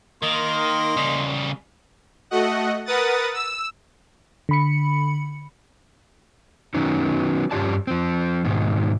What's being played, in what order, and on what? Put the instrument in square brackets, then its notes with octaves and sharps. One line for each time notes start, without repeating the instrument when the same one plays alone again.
[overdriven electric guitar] D#3 [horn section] A#3 D#5 C6
[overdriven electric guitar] C#3 G3
[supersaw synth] A3 F#4 D#5 F#5
A#4 B4 F#5 D#6 A6
E6
[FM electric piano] D3 B5 C#7
[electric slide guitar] D#3 F#3 B3 C#4 D#4
G2 C#4 F4 G4 D5 A5
F3 C4
G#2 B2 D#3